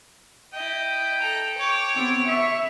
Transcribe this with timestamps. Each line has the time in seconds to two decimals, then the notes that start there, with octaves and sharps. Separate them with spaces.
0.53 E4 D#5 G5
1.20 A4 A#5
1.58 C#5 D6
1.95 B3 C4
2.28 E5 B5 C#6